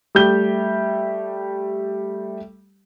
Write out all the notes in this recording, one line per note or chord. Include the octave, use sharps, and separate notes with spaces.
G3 A3 G4 G6 G7